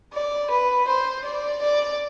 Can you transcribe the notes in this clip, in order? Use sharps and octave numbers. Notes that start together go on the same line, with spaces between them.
D5
B4
C5
D5
D5